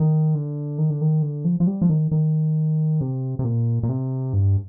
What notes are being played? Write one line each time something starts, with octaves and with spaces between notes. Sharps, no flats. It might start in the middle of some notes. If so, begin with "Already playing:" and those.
Already playing: D#3
D3
D#3
D3
D#3
D3
F3
F3
G3
F3
D#3
D#3
C3
C3
A#2
A#2
C3
G2